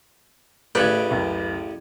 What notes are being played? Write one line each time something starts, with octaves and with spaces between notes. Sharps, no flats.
A1 A2 C#3 B4 D5 G6 G#6
C#2 F#2 C#4